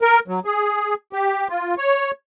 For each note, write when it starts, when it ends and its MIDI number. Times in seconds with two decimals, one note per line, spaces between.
0.02 0.20 70
0.28 0.40 54
0.45 0.94 68
1.13 1.48 67
1.49 1.75 65
1.77 2.11 73